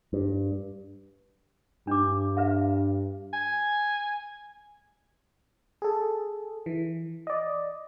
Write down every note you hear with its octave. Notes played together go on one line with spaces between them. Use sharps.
G2
G2 D4 D6
B4 E5 F5
G#5
G#4 A4
E3
D5 D#5